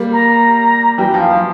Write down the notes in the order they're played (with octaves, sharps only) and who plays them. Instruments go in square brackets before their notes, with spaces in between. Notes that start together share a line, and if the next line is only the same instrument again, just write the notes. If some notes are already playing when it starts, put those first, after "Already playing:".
Already playing: [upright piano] G3 A#3
[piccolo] A#5
[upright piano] E3 G3 [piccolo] G5
[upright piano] F3
[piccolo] F5
[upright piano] F3